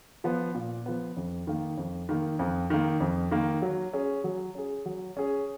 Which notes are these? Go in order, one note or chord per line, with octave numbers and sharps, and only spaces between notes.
F3 B3
A#2
F3 B3
F2
D#3 A#3
F2
D#3 A#3
F2
D#3 A#3
F2
D#3 A#3
F#3
C#4 G#4
F#3
C#4 G#4
F#3
C#4 G#4